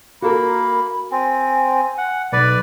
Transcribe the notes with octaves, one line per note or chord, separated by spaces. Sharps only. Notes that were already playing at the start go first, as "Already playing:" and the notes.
A#3 F#4 A4 A#4 B5
C4 G#5
F#5
B1 B4 D5